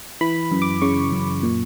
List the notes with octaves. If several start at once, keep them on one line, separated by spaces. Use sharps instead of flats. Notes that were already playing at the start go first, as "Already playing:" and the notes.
E3 B5
F#2
D6
C#3 C#6
F#2
A#2